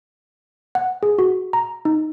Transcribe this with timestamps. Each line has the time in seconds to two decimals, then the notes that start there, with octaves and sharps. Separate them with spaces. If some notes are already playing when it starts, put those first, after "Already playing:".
0.75 F#5
1.03 G#4
1.18 F#4
1.53 A#5
1.85 D#4